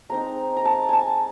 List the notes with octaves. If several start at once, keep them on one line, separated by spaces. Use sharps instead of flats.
G#3 C4 D#4 A#5
A#5
A5
G#5 A5